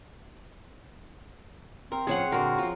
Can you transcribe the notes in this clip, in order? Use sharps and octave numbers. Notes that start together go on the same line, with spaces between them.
C4 A#4
A2 C#3 F3 G#4 C#5 F#5
A#2 D3 F#4 A#4
F3 F4